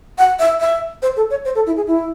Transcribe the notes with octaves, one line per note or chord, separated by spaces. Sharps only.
F#5
E5
E5
C5
A4
C#5
C5
A4
E4
G#4
E4